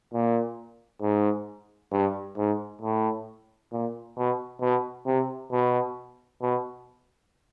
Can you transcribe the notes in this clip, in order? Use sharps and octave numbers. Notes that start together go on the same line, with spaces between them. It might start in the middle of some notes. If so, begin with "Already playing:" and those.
A#2
G#2
G2
G#2
A2
A#2
B2
B2
C3
B2
B2